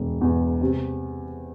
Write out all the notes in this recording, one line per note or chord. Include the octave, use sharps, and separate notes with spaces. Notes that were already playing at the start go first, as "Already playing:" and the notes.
Already playing: E1 E2
E2
C3